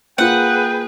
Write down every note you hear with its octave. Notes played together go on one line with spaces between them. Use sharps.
A#3 F4 G#4 B4 F#5 G5